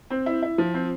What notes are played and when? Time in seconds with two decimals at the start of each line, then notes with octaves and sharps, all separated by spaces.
0.10 C4
0.26 E4
0.43 E4
0.58 F3
0.74 C4